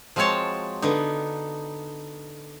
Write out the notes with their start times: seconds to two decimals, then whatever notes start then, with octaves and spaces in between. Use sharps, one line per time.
0.16 F3 G#3 C4 F#4 C#5 A5
0.82 D3 B3 D#4